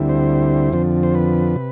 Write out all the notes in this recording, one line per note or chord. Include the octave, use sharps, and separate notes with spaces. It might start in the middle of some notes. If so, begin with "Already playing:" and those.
Already playing: D2 D3 G3 C4 E4
C5
F2 D3 F3 C4
C5
B4
C3